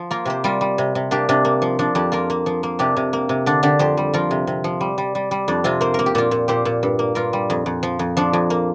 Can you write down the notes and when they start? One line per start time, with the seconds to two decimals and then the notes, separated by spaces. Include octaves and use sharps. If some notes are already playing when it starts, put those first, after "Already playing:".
Already playing: F3
0.11 A#3 F4 A#4
0.25 C3 G4 C5
0.44 G3 F4 A#4
0.61 G3
0.78 C3
0.95 C3
1.11 A#3 D4 G4
1.29 C3 D4
1.45 A#3
1.62 F3
1.79 F3 D4
1.95 F2 D4 G4
2.12 A#3 F4 A#4
2.30 A#3
2.46 F3
2.63 A#3
2.79 C3 D4 G4
2.97 C3
3.13 A#3
3.29 C3
3.46 D3 D4
3.63 D3 D4 G4
3.79 F2 G4 C5
3.97 G3
4.14 F3 F4 A#4
4.31 C3
4.47 C3
4.64 F3
4.81 G3
4.98 G3
5.15 G3
5.31 G3
5.48 F2 D4
5.64 C3 C4 F4
5.81 A#3 C5
5.94 A#3 A#4
6.06 G4
6.15 A#2 F4 A#4
6.31 A#2
6.48 A#2 G4 C5
6.65 A#2
6.83 G2
6.99 A#3
7.15 G2 F4 A#4
7.33 G3
7.50 F2
7.66 F2
7.83 F3
7.99 F2
8.17 F3 D4
8.33 F2
8.50 A#3